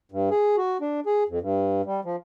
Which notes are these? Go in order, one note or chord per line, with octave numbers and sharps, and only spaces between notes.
G2
G#4
F#4
D4
G#4
F2
G2
G3
F3